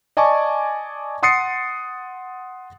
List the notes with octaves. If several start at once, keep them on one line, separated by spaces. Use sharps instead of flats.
D5 D#5 G#5 A5 C#6 D6
F#5 C6 D#6 A6 C7 C#7